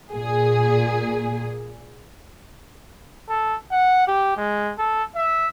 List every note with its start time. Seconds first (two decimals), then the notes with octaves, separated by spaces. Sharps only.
0.12 A#2 G#4
3.29 A4
3.72 F#5
4.07 G4
4.37 G#3
4.78 A4
5.16 E5